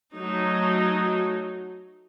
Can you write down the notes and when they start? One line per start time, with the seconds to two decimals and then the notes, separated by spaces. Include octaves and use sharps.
0.16 F#3 A3 D#4